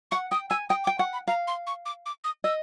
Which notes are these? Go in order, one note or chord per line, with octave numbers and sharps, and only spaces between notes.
F#5 C#6
G5 D#6
G#5 E6
G5 D#6
D6
G5
F#5 C#6
B5
F5 A#5
C6
C#6
D6
D6
D#6
D#5 E6